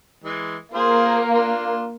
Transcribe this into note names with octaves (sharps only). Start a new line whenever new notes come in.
E3 G#3
A#3 F4 G#4 C5
D4 F4